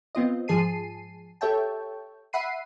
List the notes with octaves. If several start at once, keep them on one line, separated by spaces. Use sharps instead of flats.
B3 C4 F4 D#5
G#2 F3 G#4 A5 C7 D#7
G4 A4 C#5 E5 G5 A5
E5 F#5 B5 C7 D#7